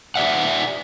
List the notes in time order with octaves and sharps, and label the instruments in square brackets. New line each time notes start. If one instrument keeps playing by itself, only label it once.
[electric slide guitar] G4 D5 E5 F#5